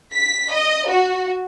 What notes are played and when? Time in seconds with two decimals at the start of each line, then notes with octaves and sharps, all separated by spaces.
0.13 B6
0.52 D#5
0.88 F#4